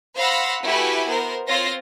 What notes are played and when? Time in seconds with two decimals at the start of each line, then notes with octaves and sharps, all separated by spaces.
0.16 C5 F5 F#5 B5 E6 A#6
0.62 A3 E4 F#4 G4 B4 G#5
1.05 B3 A#4 C5
1.47 C4 F4 C5 C#5 A#6